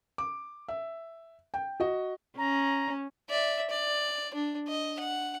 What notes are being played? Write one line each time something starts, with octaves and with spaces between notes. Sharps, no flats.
D6
E5
G5
F#4 D#5
C#4 A#5
D5 E5
D5
D4
D#5
F#5